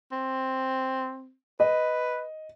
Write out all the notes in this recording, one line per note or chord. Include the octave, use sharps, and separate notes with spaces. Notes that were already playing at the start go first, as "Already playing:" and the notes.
C4
B4 D#5